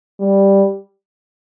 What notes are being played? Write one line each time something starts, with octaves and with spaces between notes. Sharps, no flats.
G3